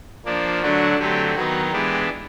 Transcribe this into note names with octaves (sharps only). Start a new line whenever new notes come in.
F3 A#3 D4
D3 F#3 A3 D4 F#4
D3 F#3 A3 C4 G4
D#3 F#3 B3 D#4 F#4
E3 G#3 B3 D4 G4